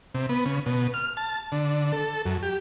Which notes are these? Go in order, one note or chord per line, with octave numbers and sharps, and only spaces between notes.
C3
B3
C#3
B2
F6
A5
D3
A4
F#2
G4